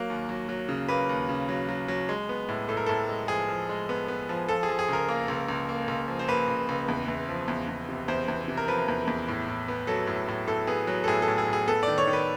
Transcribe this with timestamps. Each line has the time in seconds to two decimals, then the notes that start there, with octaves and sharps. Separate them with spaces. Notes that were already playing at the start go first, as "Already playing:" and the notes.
Already playing: F#3 A#3
0.10 D#2
0.29 F#3
0.49 F#3
0.69 C#3
0.89 A#3 B4
1.09 D#2
1.29 C#3
1.49 F#3
1.69 F#3
1.88 F#3
2.09 G#3
2.29 B3
2.49 A2
2.69 A2 A4
2.77 A#4
2.86 A2 A4
3.09 G#3
3.28 F3 G#4
3.49 F3
3.69 G#3
3.89 B3
4.08 B3
4.29 F3
4.48 F3 A4
4.63 G#4
4.69 F3
4.79 G#4
4.89 C#2 A#4
5.08 A#3
5.28 C#2
5.49 C#2
5.69 A#3
5.88 C#2
6.08 F3
6.19 C5
6.28 A#3 B4
6.48 C#2
6.69 C#2
6.88 E2
7.08 E2
7.29 F3
7.48 E2
7.69 E2
7.89 C3
8.08 E2 C5
8.28 E2
8.48 C3
8.57 A#4
8.68 F3 B4
8.88 E2
9.07 E2
9.28 A2
9.49 A2
9.68 B3
9.87 F#3 A4
10.07 A2
10.28 A2
10.47 A2 A4
10.67 B3 G#4
10.87 F#3
11.04 A4
11.08 A2 G#4
11.22 A4
11.28 A2
11.38 G#4
11.48 A2 G#4
11.68 B3 A4
11.83 D#3 D5
11.98 C#5
12.07 D#3
12.13 B4